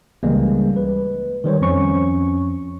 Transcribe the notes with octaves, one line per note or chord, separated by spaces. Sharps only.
C#2 C#3 E3 G3 G#3 A#3
B4
D#3 G3 C5 C#5
F2 F3 C#4 C#6